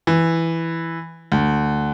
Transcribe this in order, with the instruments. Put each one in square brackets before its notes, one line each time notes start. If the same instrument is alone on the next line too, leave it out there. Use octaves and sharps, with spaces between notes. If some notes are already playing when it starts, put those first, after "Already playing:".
[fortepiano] E3
D2